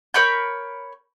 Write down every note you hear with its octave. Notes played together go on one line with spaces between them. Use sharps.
A#4 C#5 B5 G6